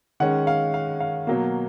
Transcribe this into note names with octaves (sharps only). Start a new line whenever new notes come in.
D#3 G#3 C#4 F#5
F5
F5
F5
B2 F#3 A#3